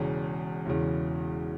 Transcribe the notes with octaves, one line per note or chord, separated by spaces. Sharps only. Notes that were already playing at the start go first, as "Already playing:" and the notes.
Already playing: E1 E2 C#3
E1 E2 C#3